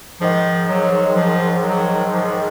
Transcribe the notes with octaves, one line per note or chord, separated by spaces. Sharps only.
G#2 D#3 F3
F#3
F3
F#3
F3